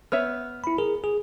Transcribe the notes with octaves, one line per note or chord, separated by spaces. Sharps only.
B3 C#5 E5 F6
E4 B5
G#4 A#4
G#4